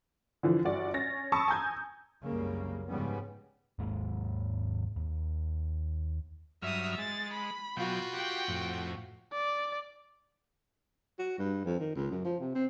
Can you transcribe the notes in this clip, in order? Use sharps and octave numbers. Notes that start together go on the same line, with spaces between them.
D3 E3 F3
G1 F#4 D5
C#4 A6 A#6
A5 B5 C#6 D#6 E6
G#5 A#5 G6 G#6
C2 F#2 C#3 G3 G#3 A#3
G#2 C#3 F3 G3 B3 C#4
D#2 G#2 G#3 A#3
D#2
G2 F#3 E5 D#6 F6
G#3 A6
B5
B2 F#3 F4 F#4 G5
G4 F#5 G5
F2 A2
D5
F#4
G2
F2
D#3
C#2
F#2
F3
C3
C4